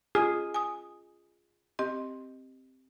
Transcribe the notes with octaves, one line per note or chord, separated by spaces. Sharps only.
F4 G#4
G#5 D#6
C4 G4 D#5